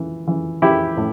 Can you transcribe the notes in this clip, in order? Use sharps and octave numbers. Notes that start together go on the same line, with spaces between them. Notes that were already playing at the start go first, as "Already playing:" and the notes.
Already playing: E3
E3
E3 E4 G4
A2